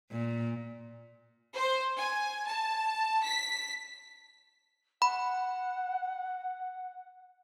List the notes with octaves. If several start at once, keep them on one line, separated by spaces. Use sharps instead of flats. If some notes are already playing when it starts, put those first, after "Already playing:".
A#2
C5
G#5
A5
B6
F#5 B5